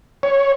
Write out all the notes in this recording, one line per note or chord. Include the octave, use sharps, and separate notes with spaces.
C#5